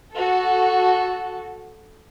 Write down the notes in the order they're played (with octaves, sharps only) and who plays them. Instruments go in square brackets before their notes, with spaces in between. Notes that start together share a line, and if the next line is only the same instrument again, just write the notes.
[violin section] F#4 A4